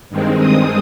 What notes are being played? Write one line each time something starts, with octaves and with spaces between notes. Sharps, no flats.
G2 D#3 G#3 C4
D#6